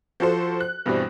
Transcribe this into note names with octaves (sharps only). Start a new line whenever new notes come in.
F3 F#4 A4 C5
F#6
G2 B2 E3 G3 C4